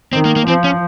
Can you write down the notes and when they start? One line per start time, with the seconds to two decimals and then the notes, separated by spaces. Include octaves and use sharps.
0.13 D#3 C4
0.25 A#3
0.36 A#3
0.47 F3 C4
0.64 C#4